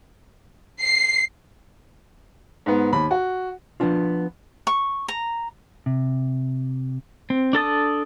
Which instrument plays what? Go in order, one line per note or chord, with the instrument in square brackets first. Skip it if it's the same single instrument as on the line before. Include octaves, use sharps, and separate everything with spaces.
[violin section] C7
[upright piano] G#2 B3
D#2 B5
F#4
[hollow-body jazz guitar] F3 B3 C#4 D4 F4
[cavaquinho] C#6
A#5
[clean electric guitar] C3
[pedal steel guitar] C4
D4 A4 A5 D#6